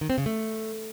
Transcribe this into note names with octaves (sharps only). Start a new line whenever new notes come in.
D#3
C4
C#3
A3